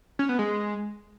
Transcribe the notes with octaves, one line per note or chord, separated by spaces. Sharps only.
C#4
B3
G#3